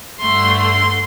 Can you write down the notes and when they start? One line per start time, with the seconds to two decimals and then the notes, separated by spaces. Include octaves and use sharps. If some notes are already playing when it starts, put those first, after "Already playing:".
0.20 G2 D3 A3 C6
0.57 C6